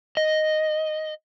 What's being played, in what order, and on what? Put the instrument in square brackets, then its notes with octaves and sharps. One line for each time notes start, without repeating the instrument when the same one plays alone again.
[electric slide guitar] D#5